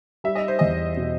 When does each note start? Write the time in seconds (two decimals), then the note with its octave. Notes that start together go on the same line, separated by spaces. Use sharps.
0.24 G3 E5
0.35 D#5
0.48 C5
0.59 E2 D#5
0.97 B2